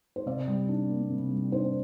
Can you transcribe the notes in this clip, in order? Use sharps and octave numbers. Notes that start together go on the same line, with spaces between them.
C5
C3 D5
G3
D4
A#3
C3
G3
D4 C5